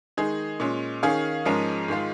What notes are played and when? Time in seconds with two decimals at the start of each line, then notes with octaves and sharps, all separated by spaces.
0.17 D#3 G#3 D#4 G#4
0.60 A#2 G#3 C#4
1.03 D#3 C#4 G#4 F5
1.45 G#2 F3 G#3 C#4 A#4
1.88 G#2 D#3 G#3 F4